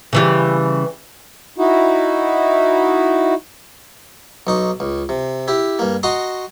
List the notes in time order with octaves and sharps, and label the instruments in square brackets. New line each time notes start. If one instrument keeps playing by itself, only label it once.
[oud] C#3 E3 G3
[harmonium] D#4 E4 F#4
[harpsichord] B1 D#4 C#6
C#2
C3
E4 G4
G2 A#3
F#4 D#5 A#5 C6 C#6